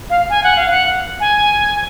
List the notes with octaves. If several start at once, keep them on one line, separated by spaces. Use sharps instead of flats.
F5
G#5
F#5
F5
F#5
G#5